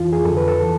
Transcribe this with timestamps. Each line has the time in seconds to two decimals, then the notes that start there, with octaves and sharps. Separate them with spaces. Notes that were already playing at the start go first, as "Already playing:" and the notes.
Already playing: F2 E3 F4
0.13 G#4
0.25 F2 D3 A4
0.37 B4
0.48 A4
0.63 E3